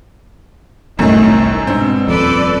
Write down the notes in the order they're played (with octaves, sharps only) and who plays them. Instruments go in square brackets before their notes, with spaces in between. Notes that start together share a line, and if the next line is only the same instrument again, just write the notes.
[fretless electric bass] G1 C2 [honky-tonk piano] F#2 A2 [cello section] D#3 A3 C4
[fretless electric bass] G#2 D4 [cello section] B2 [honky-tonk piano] C4
[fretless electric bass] D#1 F2 [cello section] A4 B4 D5